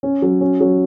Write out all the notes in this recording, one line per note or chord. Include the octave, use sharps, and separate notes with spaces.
C#4
F#3
C#4
F#3